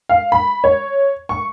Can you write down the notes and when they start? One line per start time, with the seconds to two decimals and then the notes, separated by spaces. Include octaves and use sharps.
0.09 F5
0.32 B5
0.64 C#5
1.29 C#6